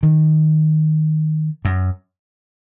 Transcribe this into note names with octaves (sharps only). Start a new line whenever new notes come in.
D#3
F#2